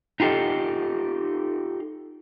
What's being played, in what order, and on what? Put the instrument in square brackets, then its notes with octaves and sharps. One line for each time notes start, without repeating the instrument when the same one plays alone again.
[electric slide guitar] D#4 F4 G4 A4 D#5